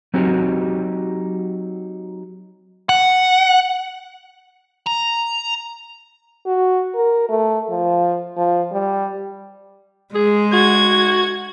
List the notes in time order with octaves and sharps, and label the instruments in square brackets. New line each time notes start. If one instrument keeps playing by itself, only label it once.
[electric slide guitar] F#3 C4 D#4 F#4 G4
[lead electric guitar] F#5
[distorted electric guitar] A#5
[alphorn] F#4
A#4
A3
F3
F3
G3
[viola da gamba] G#3 [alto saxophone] G#4
[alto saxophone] F#4 [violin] G#6